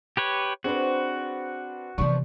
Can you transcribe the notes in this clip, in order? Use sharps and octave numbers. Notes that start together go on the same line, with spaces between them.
G4 B4 C#5
C4 D4 F#4 G#4 B4 C5
C3 E3 F3 B3 D4 C#6